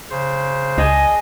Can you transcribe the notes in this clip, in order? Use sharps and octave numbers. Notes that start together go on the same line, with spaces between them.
C#3 C5
C#2 D4 G#4 D#5